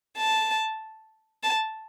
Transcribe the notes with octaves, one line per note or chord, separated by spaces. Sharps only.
A5
A5